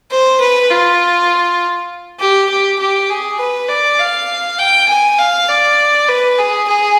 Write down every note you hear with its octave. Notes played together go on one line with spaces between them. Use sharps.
C5
B4
F4
G4
G4
G4
G#4
B4
D5
F5
G5
G#5
F5
D5
B4
G#4
G#4